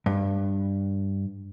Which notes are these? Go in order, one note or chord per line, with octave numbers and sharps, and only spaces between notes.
G2